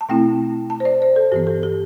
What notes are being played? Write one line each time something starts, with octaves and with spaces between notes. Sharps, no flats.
A5
B2 A3 C4 E4 G5
A5
C5
D5
C5
A4
G2 E3 B3 G4
A4
G4